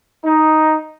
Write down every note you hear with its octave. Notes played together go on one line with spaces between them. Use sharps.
D#4